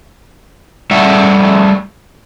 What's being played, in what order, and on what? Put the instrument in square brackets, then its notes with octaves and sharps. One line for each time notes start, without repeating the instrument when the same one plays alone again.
[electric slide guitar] G3 A3 E5 F#5